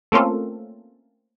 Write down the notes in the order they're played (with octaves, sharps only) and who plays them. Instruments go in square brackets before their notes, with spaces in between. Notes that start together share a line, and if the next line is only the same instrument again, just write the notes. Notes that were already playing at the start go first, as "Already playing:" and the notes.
[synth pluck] A3 A#3 C4 C#4 F4 A4